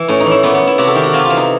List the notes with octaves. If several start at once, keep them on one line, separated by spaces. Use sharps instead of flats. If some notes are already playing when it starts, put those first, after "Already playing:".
Already playing: E3
A2 C#4
D#4
E3
E4
A#2 B3
B3
E4
C3 F#4
A4
D#3 G4
F#4
C3 F4
F4
E3
D#4